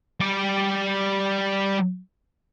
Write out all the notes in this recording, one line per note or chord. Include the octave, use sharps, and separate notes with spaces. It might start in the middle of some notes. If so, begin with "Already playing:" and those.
G3 D5